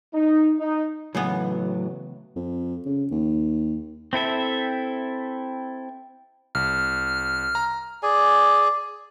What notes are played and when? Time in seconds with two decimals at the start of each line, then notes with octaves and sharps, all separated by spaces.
0.13 D#4
0.59 D#4
1.15 A2 C#3 E3 F#3 B3
2.36 F2
2.86 C#3
3.11 D#2
4.13 C4 E4 A4 E5
6.55 C2 F6
7.55 A#5
8.03 G#4 D5 G#5